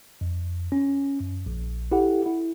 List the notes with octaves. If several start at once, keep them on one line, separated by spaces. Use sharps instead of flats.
F2
C#4
F#2
A#1
E4 G4 A4 F#5
E4